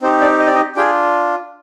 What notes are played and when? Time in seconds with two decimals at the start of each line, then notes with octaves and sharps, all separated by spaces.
0.02 C4 D#4 G4 C5
0.21 D4 D5
0.40 D#5
0.47 D5
0.54 D#4 D#5
0.75 D4 F4 G4 G#4 G5